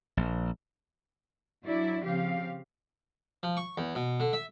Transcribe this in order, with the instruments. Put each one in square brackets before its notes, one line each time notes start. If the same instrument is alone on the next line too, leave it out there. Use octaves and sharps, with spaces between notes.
[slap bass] A#1
[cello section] F#3 D4 E4 D5
C#3 F3 C4 G4 F5
[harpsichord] F3
C#6
E2
B2
D3
E5